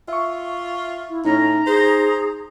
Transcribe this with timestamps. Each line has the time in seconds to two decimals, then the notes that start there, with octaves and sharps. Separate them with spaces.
0.08 F4 E5 C#6
1.10 E4
1.25 A2 C#4 D#4 A#5
1.67 G#4 C5